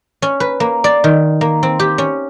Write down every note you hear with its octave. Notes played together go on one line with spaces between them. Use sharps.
C#4
B4
A#3
D5
D#3
A#3
C4
G4
C#4